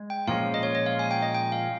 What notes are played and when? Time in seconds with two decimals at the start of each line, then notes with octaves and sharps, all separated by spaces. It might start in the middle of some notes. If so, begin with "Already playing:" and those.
Already playing: G#3
0.10 G5
0.27 A#2 F3 G#3 C#4 F5
0.54 D#5
0.63 C#5
0.75 D#5
0.86 F5
0.99 G#5
1.11 G5
1.22 D#5
1.34 G5
1.52 F5